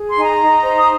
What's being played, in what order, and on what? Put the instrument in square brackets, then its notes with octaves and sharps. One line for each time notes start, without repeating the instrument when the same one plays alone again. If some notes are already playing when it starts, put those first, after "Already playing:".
Already playing: [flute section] G#4
C6
D#4 G#5
A#5
D#4
C5
D#6